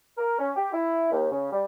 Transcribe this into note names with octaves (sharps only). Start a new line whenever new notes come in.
A#4
C#4
G4
E4
D#2
C#3
G3